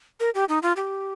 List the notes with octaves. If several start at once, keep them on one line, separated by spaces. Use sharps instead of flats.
A#4
G4
D#4
F4
G4